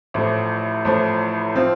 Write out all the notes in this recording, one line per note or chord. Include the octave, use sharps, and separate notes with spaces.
A1 A2 F3
A1 A2 F3
F3 C4 F4